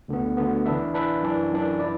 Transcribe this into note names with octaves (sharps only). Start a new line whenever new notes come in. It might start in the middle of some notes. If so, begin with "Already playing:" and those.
D2 D3 B3
D2 D3 B3
E3 D4 B4 E5
E3 D4 B4 E5
F#2 E3 D4
F#2 E3 D4
E4 D5